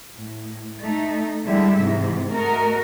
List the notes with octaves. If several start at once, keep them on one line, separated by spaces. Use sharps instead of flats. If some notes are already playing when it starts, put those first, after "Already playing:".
A2
A3 D#4
D3 G3 G#3 E4 E5
G#2 C3 E3
A3 F#4 A#4 D#5